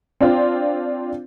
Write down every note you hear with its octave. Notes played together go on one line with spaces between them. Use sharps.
C4 D4 F4